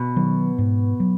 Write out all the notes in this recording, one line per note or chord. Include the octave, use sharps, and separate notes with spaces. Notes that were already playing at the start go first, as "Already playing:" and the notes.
Already playing: B2
D#3 F#3
G#2
F#3